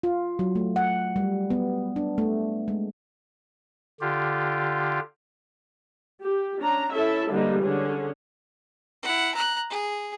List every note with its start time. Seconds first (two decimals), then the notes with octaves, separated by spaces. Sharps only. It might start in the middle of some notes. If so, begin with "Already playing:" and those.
0.03 F4
0.39 F#3
0.55 A3
0.76 F#5
1.16 G3
1.50 B3
1.96 D4
2.18 A3
2.68 G#3
4.01 D3 F4 G4
6.21 G4
6.59 C#4 D4 A#5
6.92 C#4 E4 A4 E5 A5
7.30 D3 E3 G3 G#3 A#3 D#4
7.61 D3 C#4 G#4
9.03 E4 F#5
9.35 A#5 F#6
9.70 G#4